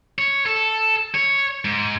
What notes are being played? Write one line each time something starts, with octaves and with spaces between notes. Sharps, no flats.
C#5
A4
C#5
G#2